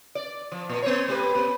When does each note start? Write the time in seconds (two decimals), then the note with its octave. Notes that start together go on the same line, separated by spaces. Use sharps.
0.15 D5
0.52 F3
0.69 A#2
0.82 B3 C5 C#5
1.08 A3 G4 B4
1.35 B3